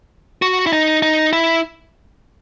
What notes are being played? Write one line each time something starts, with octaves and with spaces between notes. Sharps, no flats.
F#4
E4
D#4
D#4
E4